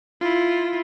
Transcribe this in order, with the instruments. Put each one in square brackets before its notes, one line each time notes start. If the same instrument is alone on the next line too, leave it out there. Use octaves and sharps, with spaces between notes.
[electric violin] E4 F4